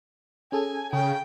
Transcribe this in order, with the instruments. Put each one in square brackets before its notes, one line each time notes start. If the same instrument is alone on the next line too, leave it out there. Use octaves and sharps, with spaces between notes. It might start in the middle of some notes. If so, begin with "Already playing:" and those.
[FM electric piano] C#4 G#4 A4 [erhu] G#5
[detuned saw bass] C#3 [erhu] G5